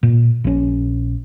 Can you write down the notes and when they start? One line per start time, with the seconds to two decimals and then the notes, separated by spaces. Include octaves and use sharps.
0.03 A#2
0.44 A#1 C#4